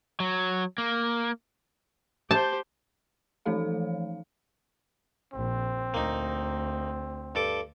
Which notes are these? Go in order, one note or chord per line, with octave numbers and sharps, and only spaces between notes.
F#3
A#3
G4 C5 A5
E3 F3 A3 D#4 A4 F5
A#1 C4
D2 A#3 D#4
G2 A4 D6